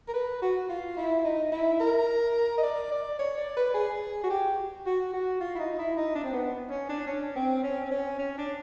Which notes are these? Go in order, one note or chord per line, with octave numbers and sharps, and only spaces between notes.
A#4
B4
F#4
F4
E4
D#4
E4
A#4
D#5
D5
D5
C#5
D5
B4
G#4
F#4
G4
F#4
F#4
F4
E4
D#4
E4
D#4
D4
C4
B3
C#4
D4
C#4
C4
C#4
C4
C#4
C#4
D4